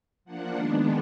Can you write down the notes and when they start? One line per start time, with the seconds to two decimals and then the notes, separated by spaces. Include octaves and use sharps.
0.25 F3 A#3 D4 F#5
0.55 D#3 G#3 B3 D4